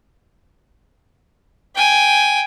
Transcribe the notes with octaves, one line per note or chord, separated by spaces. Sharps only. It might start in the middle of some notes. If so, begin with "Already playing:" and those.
G5 G#5